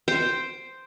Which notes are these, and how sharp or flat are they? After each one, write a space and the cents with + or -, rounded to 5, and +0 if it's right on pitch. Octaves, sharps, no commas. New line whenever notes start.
C5 +0 G5 +0